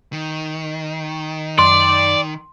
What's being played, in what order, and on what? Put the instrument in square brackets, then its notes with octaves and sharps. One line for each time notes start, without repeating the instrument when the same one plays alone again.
[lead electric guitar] D#3
[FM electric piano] F#2 [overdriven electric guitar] D5 [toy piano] C6